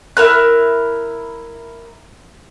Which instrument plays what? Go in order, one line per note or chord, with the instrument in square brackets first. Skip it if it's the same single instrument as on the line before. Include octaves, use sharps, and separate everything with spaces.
[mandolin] E4 A#4 F#6